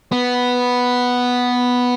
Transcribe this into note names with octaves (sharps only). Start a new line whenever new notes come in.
B3